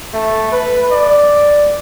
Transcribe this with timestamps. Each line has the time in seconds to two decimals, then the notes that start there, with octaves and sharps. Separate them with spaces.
0.14 A3
0.52 B4
0.92 D5